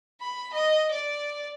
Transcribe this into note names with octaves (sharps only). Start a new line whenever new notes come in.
B5
D#5
D5